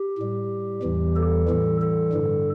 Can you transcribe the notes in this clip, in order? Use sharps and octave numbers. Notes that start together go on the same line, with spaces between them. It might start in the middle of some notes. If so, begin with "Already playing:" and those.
Already playing: G4
A2 G3
E2 E3 G3
A4
A2 E3 G3
A4
G2 D3 G3